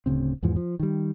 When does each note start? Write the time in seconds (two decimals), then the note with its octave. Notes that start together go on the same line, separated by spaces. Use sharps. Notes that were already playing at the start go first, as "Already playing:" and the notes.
0.06 D1 D2 C#3 C4
0.43 E2 G#2 E3 F3
0.56 F3
0.80 D#3 G3